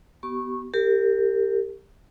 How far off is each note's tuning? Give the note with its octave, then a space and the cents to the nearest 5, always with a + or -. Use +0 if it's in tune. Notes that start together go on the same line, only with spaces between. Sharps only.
B3 +0 G4 -40 C#6 -20
G4 +10 A#4 -30